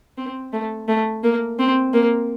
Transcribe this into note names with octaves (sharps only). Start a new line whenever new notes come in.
C4
A3
A3
A#3
C4
A#3